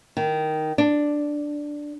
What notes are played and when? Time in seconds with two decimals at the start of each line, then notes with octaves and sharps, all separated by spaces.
0.17 D#3
0.78 D4